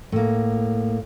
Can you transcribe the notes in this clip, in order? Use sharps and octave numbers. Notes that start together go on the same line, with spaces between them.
A2 A#3